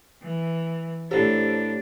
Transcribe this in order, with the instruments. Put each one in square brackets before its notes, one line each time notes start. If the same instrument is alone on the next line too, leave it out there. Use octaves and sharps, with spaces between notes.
[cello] E3
[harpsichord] A2 A#5 [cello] D4 [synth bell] G4 C5